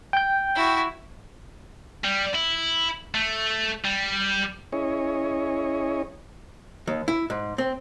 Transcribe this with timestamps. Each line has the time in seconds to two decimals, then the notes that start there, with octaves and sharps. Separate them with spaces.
0.13 G5 G6
0.55 E4 F#4
2.04 G3
2.35 E4
3.15 A3
3.84 G3
4.72 C#4 E4 G#4 C#5 D#5
6.87 D#2
7.08 E4
7.30 G#2
7.58 C4